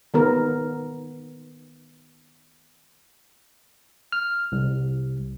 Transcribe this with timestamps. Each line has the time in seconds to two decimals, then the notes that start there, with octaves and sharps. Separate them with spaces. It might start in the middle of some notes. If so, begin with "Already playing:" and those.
0.14 D#3 B3 A#4
4.12 F6
4.52 C2